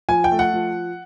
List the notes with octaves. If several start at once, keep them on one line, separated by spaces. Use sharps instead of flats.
F3 G#5
G5
A3
F#5
F3